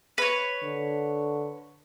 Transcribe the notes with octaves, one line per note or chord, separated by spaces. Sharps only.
B4 C#5
D3